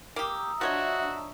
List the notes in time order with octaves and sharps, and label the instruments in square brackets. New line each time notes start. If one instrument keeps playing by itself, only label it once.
[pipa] A#3 G4 [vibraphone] A#5 D#6 E6
[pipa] F3 C#5 D#5 [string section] D4 E5 [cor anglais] F#4